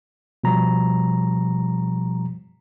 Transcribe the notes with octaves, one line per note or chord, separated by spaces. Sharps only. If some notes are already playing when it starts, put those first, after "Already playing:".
B2 F3 G3 A#5